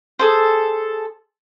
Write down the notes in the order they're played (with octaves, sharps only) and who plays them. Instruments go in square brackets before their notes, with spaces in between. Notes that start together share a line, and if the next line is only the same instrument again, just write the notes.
[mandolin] G#4 A4 C5